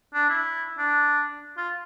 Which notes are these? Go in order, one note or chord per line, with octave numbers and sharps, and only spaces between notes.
D4
E4
D4
F4